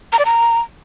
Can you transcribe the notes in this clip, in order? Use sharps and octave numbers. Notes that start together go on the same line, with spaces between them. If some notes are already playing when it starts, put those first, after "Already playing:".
A#5
D5
A#5